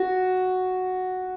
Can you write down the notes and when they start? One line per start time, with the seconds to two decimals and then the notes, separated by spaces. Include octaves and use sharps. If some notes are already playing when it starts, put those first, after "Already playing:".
Already playing: F#4